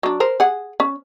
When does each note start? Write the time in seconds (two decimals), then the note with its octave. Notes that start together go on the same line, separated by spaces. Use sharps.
0.03 F#3 D4
0.20 A#4 C5
0.40 G#4 F#5
0.80 C#4